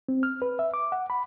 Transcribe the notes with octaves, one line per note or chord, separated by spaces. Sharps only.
C4
F6
B4
E5
D6
F#5
B5